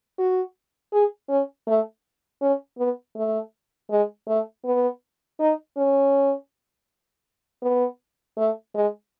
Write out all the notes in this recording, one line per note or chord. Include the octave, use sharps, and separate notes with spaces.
F#4
G#4
C#4
A3
C#4
B3
A3
G#3
A3
B3
D#4
C#4
B3
A3
G#3